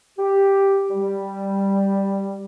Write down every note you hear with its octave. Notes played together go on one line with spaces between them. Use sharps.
G4
G3